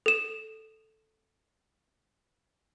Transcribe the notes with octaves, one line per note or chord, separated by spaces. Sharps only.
A4 E7